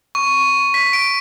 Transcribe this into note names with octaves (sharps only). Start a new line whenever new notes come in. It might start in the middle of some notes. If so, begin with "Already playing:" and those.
C#6
B6
D7